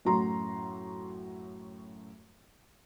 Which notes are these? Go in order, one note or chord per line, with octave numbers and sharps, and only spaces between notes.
F#2 A2 F#3 F#4 A#5 C6